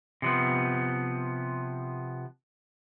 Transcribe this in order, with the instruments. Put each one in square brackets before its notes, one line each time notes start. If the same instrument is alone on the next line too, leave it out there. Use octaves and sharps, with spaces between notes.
[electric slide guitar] C3 F3 B3